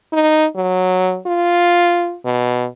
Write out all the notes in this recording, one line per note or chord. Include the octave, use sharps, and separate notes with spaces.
D#4
F#3
F4
B2